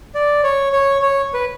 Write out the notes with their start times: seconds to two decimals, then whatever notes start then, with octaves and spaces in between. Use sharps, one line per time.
0.15 D5
0.43 C#5
0.73 C#5
1.02 C#5
1.34 B4